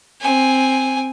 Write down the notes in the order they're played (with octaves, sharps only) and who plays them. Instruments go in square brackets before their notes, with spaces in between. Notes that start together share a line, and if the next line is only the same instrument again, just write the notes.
[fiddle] C4 G#5